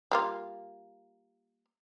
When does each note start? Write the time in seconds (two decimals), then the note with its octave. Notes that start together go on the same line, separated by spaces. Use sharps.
0.11 G3 A#3 F4